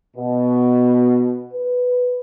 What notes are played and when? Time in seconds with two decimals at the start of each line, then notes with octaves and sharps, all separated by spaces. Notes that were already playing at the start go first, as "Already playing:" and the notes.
0.17 B2
1.53 B4